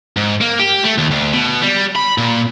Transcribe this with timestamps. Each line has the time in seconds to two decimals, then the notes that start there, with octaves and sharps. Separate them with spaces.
0.17 G#2
0.41 A#3
0.59 G4
0.84 A3
0.98 D#2
1.11 D2
1.34 B2
1.62 G3
1.95 B5
2.18 A#2